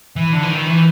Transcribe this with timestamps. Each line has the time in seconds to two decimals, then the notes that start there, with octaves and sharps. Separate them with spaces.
0.16 E3
0.33 D3
0.43 E3
0.50 D#3
0.67 E3